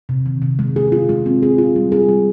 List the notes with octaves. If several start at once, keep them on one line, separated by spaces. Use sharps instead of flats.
C3
D#3
C3
G#3
G#4
F4
G#3
C4
G#4
F4
G3
G#4
G3